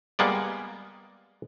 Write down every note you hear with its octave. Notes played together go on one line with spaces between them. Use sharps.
G3 G#3 A#3 B3 D5